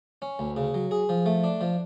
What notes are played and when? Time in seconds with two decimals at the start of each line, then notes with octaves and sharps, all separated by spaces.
0.22 C#4
0.39 D2
0.57 C#3
0.74 F#3
0.91 G#4
1.09 F3
1.26 A3
1.44 D4
1.61 F3